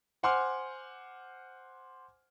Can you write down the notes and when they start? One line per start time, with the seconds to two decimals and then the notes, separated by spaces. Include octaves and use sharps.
0.23 C5 F#5 G#5 C6 D6 F6